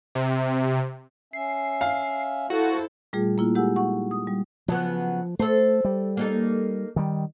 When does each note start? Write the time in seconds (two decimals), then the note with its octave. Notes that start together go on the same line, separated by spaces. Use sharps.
0.15 C3
1.33 C#4 E5 C7
1.81 F5
2.50 E4 F#4 A4 C5
3.13 A#2 G3 A3 F4 G#4
3.38 A#3 E4 F4
3.55 G#3 G4 A4 F#5 G#5 E6
3.76 D#4 F#5 C#6
4.11 D#6
4.27 G3
4.68 C#3 F3 F#3 B3
5.39 A3 A4 C5
5.84 G3
6.17 A#3 D#4 A4
6.96 D#3 G3